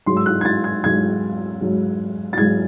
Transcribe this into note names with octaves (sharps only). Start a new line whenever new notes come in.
G#2 F#3 C6
E6
F#6
G#6
A6
G#6
G#2 F#3 G#6
G#2 F#3
A6
G#2 F#3 G#6